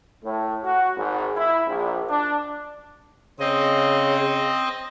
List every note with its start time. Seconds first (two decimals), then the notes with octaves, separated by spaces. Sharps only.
0.24 A2
0.65 F#4
0.97 G#1
1.37 E4
1.67 A#1
2.09 D4
3.40 C#3 C4 D#5